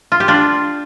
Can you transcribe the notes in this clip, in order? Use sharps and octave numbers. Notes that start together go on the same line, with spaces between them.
F4
G4
D4 F4